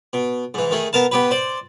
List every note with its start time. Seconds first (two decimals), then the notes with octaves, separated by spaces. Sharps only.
0.13 B2
0.54 G#2 E3
0.71 D#3 A3 G#4
0.93 B3 A#4 F5 A5
1.11 B3 G4 B4
1.31 C5 D5